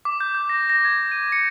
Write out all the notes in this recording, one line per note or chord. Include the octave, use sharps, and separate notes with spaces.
D6
G6
G6
A#6
A#6
G#6
D#7
C#7